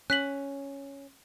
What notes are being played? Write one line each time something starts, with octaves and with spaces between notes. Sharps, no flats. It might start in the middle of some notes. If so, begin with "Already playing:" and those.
C#4 F#6 B6 F#7